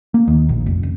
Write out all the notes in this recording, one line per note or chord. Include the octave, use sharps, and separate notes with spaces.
A#3
D#2
A#1
F1
F1